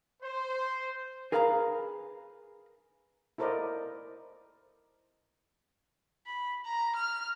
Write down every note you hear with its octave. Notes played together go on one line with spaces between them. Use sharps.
C5
G#4 A#4 B4 F5 G#5 A#5
E4 A4 A#4 C5 D5 D#5
B5
A#5
F6